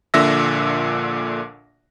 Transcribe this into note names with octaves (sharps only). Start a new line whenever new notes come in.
A#1 A#2 D3 E5 E6 A#6